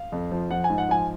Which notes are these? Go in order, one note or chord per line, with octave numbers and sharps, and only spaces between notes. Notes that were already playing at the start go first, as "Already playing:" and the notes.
Already playing: F5
F2
F3
F3 F#5
G#5
G#2
F#5
F3 G#5